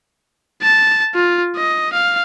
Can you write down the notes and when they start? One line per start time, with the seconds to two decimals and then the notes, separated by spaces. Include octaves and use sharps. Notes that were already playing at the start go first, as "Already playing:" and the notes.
0.62 A5
1.15 F4
1.56 D#5
1.93 F5